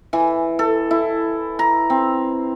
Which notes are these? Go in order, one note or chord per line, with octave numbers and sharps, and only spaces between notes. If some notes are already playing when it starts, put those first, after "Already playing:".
E3
A4
E4
A#5
C4